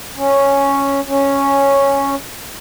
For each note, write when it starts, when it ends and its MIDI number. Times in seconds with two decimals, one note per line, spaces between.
0.17 1.00 61
1.07 2.15 61